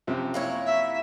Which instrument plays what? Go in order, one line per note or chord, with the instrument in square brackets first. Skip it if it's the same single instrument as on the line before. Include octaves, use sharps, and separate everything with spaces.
[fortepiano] F#2 C3 F3
[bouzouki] A#3 E4 C#5
[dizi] E5